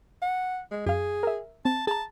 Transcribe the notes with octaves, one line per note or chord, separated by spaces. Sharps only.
F#5
G#3
F#2 G#4 F5
A#4 E5
C4 A5
G#4 A5 A#5